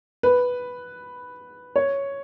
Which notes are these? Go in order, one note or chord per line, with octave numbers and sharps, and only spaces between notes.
B4
C#5